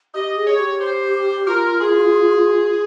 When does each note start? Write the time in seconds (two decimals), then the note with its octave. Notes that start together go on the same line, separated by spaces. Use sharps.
0.14 G4 D#5
0.37 G#4
0.47 C#5
0.58 G4
0.81 C5
1.48 F4 A#4
1.81 G#4